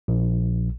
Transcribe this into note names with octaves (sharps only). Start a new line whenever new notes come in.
A#1